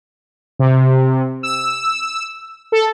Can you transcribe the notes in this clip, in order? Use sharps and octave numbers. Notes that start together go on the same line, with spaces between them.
C3
E6
A4